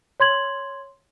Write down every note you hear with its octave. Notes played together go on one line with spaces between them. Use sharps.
C#5 C6 G#6 F#7